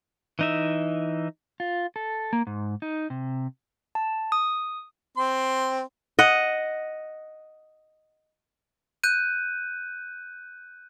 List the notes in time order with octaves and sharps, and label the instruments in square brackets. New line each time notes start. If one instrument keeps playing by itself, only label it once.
[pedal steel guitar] E3 D#4 E5
[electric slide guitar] F4
A4
A#3
G#2
D#4
C3
[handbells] A5
D#6
[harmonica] C4 C6
[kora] D#5 F#5
[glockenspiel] F#6 G6 D#7